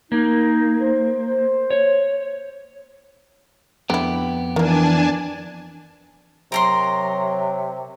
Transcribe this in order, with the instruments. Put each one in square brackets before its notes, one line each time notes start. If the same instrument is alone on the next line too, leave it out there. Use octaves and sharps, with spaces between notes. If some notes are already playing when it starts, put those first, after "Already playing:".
[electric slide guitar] A#3 [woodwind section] D#4
[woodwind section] C5
[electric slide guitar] C#5
[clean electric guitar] F2 B3 G4 [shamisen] D3 E4
[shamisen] D#3 A#3 [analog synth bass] E3 [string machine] D4 G#5 A5
[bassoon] C3 [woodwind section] F#3 [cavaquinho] A#4 A#5 C6